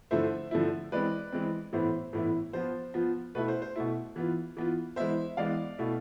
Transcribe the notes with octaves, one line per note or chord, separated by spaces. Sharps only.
D3 F3 A3 E4 C5 E5
D3 F3 A3 E4
E3 G#3 C4 B4 D5
E3 G#3 C4
A2 E3 B3 E4 C5
A2 E3 B3 E4
F3 B3 F4 C5
F3 B3 F4
B2 A3 E4 B4
C5
C5
B2 A3 E4
E3 B3 F4
E3 B3 F4
E3 G#3 B3 C5 E5
E3 G#3 B3 D5 F5
B2 A3 E4